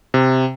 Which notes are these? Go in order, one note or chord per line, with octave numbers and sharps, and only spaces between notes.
C3